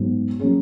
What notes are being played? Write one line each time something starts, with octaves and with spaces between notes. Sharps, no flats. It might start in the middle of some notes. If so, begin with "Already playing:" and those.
Already playing: G#2 F#3 B3
F#3 A#3 C#4 G#4